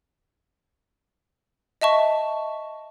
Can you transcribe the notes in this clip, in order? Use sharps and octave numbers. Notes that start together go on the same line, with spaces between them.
D#5 E5 A5 C#6